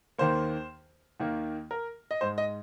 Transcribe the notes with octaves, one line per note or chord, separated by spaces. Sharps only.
D#2 D#3 A#3 C5
D#2 D#3 A#3
A#4
D#5
G#2 G#3 C5
D#5